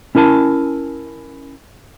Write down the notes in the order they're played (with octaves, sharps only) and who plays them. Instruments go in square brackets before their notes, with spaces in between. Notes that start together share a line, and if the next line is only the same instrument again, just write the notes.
[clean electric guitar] C#4 E4 A#4 G#5 A5